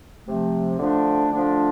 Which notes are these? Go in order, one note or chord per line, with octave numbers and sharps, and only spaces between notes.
C3 F3 A3
D3 F3 A3 D4
D3 F3 A3 D4